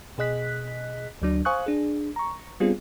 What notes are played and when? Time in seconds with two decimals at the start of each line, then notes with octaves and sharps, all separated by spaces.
0.18 B2 G#4 D#5 F#6 B6
1.22 D2 F#3 D4
1.45 C5 F5 G#5 C#6 D#6 F#6
1.66 D4 G#4
2.16 A#5 C#6
2.60 G3 B3 C4 D4 F4 G#4